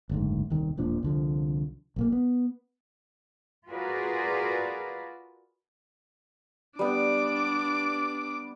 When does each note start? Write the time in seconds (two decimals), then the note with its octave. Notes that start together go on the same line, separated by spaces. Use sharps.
0.09 F#1 D2 G#2
0.50 D#1 C2 D#3
0.78 E1 A#2 F3 D4
1.03 C2 D3 F3
1.96 B1 A#2 A#3
2.12 B3
3.69 F4 F#4 G#4 A#4 B4 D5
6.79 G3 B3 D4 D6